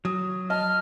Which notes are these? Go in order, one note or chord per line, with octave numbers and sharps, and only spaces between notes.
F#3 D#6
D#5 A5 F6